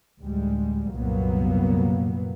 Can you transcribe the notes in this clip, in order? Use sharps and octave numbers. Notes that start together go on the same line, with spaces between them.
D2 A2 G3 G#3
C2 F#2 A#2 F#3 A#3 B3